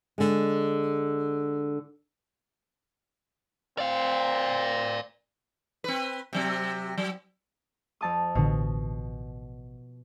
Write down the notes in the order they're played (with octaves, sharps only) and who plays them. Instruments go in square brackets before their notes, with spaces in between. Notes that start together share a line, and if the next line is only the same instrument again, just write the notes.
[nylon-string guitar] D3 G#3
[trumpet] C4 [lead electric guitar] D5 F5
[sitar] C4 B4
C3 F#3 C4
F#3
[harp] F2 A5 D#6
[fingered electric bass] A1 D3 [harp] B2